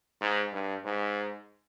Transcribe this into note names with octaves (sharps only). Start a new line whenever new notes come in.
G#2
G2
G#2